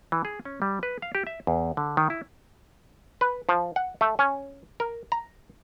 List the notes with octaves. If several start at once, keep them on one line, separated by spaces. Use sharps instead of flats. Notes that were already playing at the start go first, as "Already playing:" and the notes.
E3
G#4
C#4
G3
B4
F5
G4
E5
E2
D3
D#3
E4
B4
F3
F#5
A3
C#4
A#4
A#5